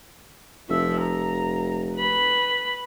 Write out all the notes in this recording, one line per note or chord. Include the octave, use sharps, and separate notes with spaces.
F1 F3 E5
A#5
B4 B5